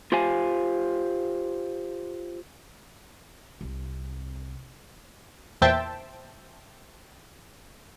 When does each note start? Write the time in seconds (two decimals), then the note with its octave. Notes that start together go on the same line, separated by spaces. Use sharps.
0.12 F4 G4 C5 F5 G#5
3.61 C2 C3
5.62 E2 A#2 C5 E5 G5 A5